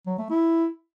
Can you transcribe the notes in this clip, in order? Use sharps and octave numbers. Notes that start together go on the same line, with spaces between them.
F#3
A3
E4